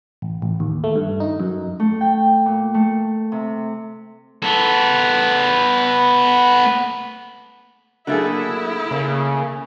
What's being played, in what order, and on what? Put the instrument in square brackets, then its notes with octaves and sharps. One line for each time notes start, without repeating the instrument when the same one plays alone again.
[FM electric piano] A1
A1
D#2
A3
G2
D#4
F#2
[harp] A3
G5
A#2
A3
C3
[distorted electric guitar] B3 A4
[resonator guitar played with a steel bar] D3 A3 G#4 [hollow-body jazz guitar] F#3 A#3 [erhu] E4
[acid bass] C#3 [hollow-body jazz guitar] A#3